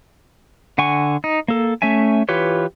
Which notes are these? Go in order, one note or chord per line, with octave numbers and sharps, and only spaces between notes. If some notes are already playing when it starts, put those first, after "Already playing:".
D3 F#5 G#5 C#6
D#4
A#3 A4
A3 C#4 E5 G#5
E3 F4 G4 B4 C#5